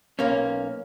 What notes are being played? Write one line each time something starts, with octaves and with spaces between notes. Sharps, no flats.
B1 A#3 C#4